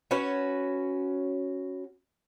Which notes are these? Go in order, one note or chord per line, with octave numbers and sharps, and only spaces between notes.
C#4 F#4 B4 C#5